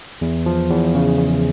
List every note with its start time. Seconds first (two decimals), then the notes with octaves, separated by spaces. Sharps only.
0.21 E2
0.46 F3
0.70 E2
0.95 C#3
1.19 E2